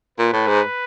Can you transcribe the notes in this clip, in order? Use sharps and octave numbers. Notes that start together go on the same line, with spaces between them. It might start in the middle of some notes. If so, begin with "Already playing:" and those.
A#2 B4
A2
G#2